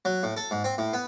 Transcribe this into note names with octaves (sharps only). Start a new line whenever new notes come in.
F#3
A2
A4
G#2
C4
A2
B3